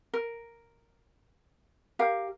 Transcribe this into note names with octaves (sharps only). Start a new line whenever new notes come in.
A#4
G4 A#4 F5